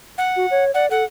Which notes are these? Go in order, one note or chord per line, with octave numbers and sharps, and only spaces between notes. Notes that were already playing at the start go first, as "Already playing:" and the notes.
F#5
F#4
C#5
D5 F#5
A4 F#5